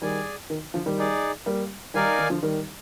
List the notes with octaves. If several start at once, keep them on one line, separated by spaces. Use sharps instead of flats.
D#3 G3 G#4 D5 G#5
D#3
D3 F3
D#3 G3
D#4 G#4 D5
G3 A#3
D#3 G3 D#4 A#4 D5 F5 G#5
D#3
D3 F3
D#3 G3